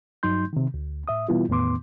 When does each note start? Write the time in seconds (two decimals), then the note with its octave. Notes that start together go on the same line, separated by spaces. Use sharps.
0.23 G2 F#3 D#4 C6 G6
0.53 C3 D#3
0.74 D2
1.08 A2 E5 D#6
1.29 B2 E3 G3 B3 E4 F4
1.49 E2 A2 D#3 B3 C6 D6